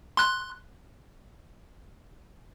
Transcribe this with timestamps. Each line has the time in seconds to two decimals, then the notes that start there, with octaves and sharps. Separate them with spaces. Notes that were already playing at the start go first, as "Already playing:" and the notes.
0.17 C6 F#6